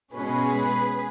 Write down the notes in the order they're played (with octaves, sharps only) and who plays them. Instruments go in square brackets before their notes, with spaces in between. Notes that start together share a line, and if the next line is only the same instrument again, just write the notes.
[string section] B2 G#3 C#4 G#4 B4